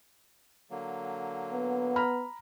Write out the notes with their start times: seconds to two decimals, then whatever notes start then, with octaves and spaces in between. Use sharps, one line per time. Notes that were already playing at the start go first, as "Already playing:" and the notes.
0.71 D3 F#3 A#3
1.53 B3
1.96 A#5 B5 F6